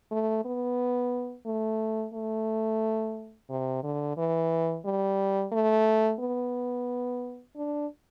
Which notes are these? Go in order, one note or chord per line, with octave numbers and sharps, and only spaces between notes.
A3
B3
A3
A3
C3
D3
E3
G3
A3
B3
D4